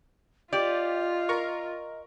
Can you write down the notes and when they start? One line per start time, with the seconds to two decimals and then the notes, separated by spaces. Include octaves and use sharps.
0.53 F4 G4 D5 D#5
1.29 A#4 C#6